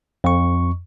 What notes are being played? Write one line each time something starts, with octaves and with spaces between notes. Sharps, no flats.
F2 C#6